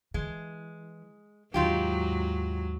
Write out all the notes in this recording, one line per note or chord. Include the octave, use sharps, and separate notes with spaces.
E3 G#3
D#2 G#2 F#3 D#4 F4 G4